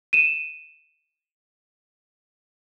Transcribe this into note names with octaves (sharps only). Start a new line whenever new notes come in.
D#7 E7